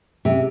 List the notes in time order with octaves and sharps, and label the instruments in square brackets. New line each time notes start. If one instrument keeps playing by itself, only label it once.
[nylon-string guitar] C3